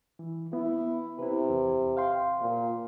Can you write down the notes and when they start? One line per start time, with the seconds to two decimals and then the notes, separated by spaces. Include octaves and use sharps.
0.19 E3
0.53 B3 E4
1.19 C3 E4 B4
1.50 E2
1.97 F5 G5 C6
2.40 A#2